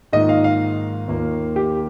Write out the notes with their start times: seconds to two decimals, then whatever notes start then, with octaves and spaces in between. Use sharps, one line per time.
0.13 G#2 D#3 A#3 F4 D#5
0.29 F5
0.44 F5
1.08 D#2 D#3 A#3 F4
1.56 G4